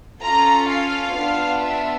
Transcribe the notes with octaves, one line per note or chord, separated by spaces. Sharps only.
C#4 F4 A4 A#5
F5
B3 D4 F4
E5